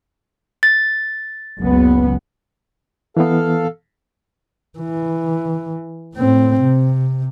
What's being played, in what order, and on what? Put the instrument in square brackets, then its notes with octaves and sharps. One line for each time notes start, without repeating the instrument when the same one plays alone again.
[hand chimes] A6
[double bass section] F#1 C#2 B3
[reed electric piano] E3 B3 [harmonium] A4 F5
[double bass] E3
A2 C4
C3